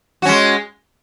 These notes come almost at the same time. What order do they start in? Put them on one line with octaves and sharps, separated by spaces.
F#4 C#4 G#3